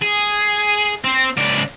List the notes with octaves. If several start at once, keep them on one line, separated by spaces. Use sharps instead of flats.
G#4
C4
C#2 D5